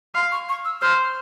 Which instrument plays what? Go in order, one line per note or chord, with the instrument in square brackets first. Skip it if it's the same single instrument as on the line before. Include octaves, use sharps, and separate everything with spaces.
[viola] F5 [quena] C6
[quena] C#6
C#6
E6
[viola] C5 [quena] F6